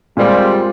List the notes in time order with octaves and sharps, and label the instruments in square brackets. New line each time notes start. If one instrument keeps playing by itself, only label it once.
[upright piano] A#2 G#3 C4 F4 [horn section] G3